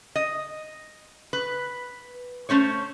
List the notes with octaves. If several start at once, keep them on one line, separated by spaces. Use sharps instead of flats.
D#5
B4
A3 C#4 C5 C#5